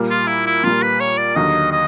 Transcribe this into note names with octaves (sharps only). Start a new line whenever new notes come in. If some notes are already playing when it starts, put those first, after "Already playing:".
Already playing: A#2 G3 A#3
F4
E4
E4
A#2 G3 A#3 F4
B4
C#5
D5
D#2 D3 F#3 D#5
D#5